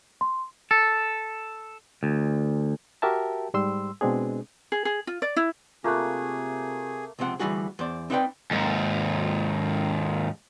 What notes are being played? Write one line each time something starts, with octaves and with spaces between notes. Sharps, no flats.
C6
A4
D2
F#4 G4 A#4 E5 G5 A5
G#2 G3 C6 E6
B2 G#3 C4 D4 G#4
G#4
G#4
F4
D5
E4
C3 A3 A#3 F4 G#4 F#6
C#2 C3 F3 C4 F#5
D2 B2 E3 G3 F#4 G#4
E2 C5 D5
C4 D#4 E4 B4 D5 G5
D#2 G#2